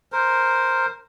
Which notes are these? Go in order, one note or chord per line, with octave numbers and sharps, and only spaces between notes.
A#4 C5